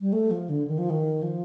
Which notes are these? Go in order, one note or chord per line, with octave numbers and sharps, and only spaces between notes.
G3
A3
F3
D3
D#3
F3
D#3
F3